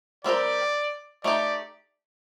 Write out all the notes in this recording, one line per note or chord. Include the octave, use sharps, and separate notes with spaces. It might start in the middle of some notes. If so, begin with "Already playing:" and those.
G3 C4 G4 A#4 D5
A3 D#4 G4 D5